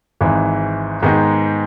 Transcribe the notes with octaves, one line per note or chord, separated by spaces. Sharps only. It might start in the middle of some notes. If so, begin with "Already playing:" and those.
G#1 G#2 E3
G#2 D#3 G#3 B3 D#4